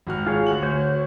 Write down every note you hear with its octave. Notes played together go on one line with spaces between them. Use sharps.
G#1 F#4 F6
F4 G#4 C#5
D2 F#4 F#7
D2 F#4 C#5 G6